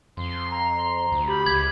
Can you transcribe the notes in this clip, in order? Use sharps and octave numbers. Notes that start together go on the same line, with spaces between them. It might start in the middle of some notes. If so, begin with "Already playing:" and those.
F2 C6
A#5
A#5
D2
G4 B5
C#2 G#6